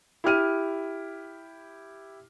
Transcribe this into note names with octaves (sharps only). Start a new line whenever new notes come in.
E4 G4 F6 D#7